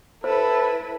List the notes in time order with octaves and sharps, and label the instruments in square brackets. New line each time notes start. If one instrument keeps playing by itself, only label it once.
[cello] E4 B4 [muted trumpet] A4 [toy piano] C5